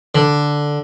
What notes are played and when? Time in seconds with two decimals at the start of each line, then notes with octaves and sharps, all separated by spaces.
0.15 D3